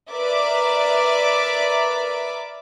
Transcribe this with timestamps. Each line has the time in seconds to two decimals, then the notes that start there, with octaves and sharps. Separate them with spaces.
0.11 A#4 B4 D5 E5 D6